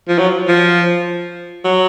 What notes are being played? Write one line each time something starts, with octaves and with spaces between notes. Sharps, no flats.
F3
F#3
F3
F#3